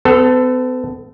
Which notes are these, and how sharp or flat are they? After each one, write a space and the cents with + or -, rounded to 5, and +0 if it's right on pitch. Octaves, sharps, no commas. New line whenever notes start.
B3 +45 A4 +0